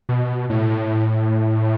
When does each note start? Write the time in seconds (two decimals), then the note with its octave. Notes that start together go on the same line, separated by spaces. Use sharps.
0.09 B2
0.50 A2